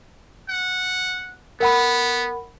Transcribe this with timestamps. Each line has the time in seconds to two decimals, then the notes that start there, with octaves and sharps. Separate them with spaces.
0.49 F#5
1.60 B3 A#4 F#5 B5